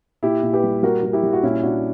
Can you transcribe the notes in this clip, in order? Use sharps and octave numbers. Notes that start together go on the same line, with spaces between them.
A#2 E4 G4
A#2
G4 B4
G3
G3 F#4 A#4
G3 A#4
E4 G4
G3
F#4
A#2 C#4 E4
A#2 D4 F#4